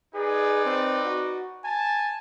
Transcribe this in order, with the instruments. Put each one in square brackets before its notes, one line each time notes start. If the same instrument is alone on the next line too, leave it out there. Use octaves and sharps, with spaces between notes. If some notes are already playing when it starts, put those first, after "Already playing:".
[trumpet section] D#4 B4 D5 [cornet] G#4
[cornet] C4
F#4
[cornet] G#5 [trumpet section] A5